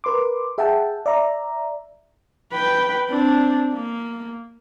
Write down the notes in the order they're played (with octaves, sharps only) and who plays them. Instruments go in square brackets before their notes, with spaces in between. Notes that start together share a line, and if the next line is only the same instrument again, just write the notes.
[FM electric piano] A#4 B4 C6 D6
G#4 E5 F#5 G5 A5
D5 E5 A#5
[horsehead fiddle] B4 G5
C4 D4
A#3